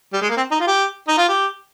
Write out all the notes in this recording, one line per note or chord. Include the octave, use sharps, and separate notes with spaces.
G3
G#3
A#3
C4
D#4
F4
G4
D#4
F4
G4